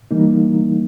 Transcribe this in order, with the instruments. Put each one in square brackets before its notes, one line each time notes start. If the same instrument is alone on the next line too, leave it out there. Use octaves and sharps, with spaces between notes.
[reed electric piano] E3 G3 A#3 D#4